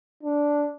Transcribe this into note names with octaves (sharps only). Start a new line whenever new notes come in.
D4